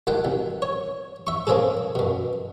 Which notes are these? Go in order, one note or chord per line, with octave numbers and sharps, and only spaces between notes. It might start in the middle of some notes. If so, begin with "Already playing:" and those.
D2 D#3 F#5 G5
C2
C#5
E5 C#6
A#3 C4 C#4 G#4 A4
F#2 B2